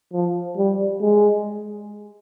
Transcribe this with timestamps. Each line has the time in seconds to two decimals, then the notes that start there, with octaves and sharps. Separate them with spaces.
0.13 F3
0.57 G3
1.02 G#3